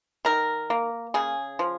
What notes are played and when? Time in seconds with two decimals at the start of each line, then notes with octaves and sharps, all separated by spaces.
0.25 D#3 A#4
0.70 A#3
1.14 C#3 G#4
1.59 F3